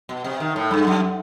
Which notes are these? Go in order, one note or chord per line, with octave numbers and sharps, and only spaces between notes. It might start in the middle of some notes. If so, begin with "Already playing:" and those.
B2
C3
D#3
A2
G2
F#2